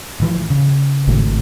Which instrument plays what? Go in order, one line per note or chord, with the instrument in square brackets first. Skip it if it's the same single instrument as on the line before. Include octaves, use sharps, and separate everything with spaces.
[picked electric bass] A1 E3 F3
C#3
[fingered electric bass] G#1 A2